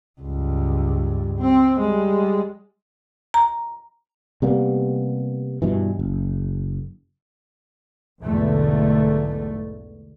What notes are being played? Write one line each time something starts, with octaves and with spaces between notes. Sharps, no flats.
C#2 G2
C4
G3 G#3
A#5
C3 G3 A#3 B3
G2 B2 E3
F#1
B1 E2 G#2 D3 A3